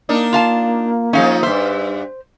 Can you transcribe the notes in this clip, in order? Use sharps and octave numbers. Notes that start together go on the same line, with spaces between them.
A#3 D4 D#4 A#4
F4 F5 A5
F3 G#3 C#4 D#4 F5
G2 C5 E5